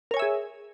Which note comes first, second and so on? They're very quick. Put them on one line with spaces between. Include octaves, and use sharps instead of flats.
A#4 C#5 G#5 E5 G#4